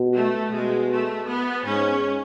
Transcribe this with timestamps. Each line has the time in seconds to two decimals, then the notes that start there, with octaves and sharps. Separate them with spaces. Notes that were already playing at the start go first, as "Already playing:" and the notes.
Already playing: B2
0.15 A3
0.53 B2 G#3
0.91 A3
1.28 B3
1.66 G#2 C#4